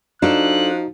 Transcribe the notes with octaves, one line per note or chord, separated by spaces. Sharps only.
F3 D4 D#4 F#4 A4 F#6